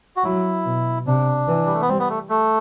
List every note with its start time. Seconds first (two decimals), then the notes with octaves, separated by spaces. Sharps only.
0.17 F#4
0.24 F#3 E4
0.66 B2
1.06 C3 D4
1.48 E3
1.66 G3
1.74 A3
1.82 B3
1.89 G3 C4
1.99 B3
2.10 A3
2.30 A3